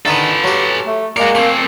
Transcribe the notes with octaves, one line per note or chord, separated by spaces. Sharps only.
D3 D#3 D#4 A4 B4
F#3 G4
A3
G#3 A#3 F#4 A#4 D5
A3 C4 G#5